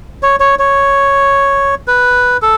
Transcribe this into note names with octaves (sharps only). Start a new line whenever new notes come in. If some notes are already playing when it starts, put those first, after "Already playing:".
C#5
C#5
C#5
B4
A4